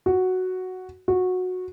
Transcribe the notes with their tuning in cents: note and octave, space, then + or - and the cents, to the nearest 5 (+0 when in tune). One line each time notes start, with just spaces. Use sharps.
F#4 +0
F#4 -15